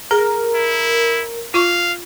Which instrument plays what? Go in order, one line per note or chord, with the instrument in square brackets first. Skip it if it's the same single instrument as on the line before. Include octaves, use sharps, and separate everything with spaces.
[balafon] G#4 [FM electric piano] A#4
[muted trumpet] E4
[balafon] F4 C#6 [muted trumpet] F5